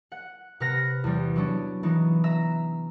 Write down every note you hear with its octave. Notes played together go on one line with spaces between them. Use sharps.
F#5
C3 B4 F#5 F6 A#6 B6
E2 G3
F#3 B3 C#4 D4
E3 B3 C#4 D#4
E5 A#5